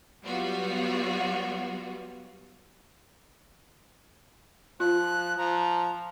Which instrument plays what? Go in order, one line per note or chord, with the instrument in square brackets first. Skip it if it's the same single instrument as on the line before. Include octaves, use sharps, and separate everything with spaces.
[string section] F#3 G3 B3 F4 F#4
[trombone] F3 [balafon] F4 [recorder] F#6
[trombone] F3 [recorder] A#5